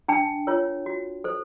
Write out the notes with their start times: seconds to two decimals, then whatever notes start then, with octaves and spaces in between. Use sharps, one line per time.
0.08 D4 G5 A5
0.47 F4 A#4 C#5
0.86 F#4
1.24 A4 C5